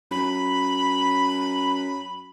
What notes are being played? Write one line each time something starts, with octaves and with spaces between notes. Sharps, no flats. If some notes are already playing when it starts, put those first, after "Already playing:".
F#2 B5